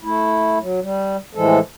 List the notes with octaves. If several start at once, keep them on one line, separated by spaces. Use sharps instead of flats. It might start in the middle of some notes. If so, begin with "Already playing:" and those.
A3 E4
F#3
G3
A2 E3 F3 G#3 A4